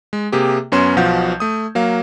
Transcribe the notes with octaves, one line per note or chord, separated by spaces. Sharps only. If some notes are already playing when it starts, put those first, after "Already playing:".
G#3
C3 A#3 G4 G#4
F#2 B3 C#4 C6 G#6 E7
B1 B2 F3 F5 F#5 G6
A3 D#6
F#3 A#3 F5